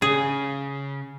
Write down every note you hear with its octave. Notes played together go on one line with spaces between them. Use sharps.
C#3 G#4